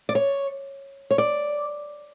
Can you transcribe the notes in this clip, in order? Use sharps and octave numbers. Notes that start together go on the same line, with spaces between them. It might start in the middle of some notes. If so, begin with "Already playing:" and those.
D5
C#5
C#5
D5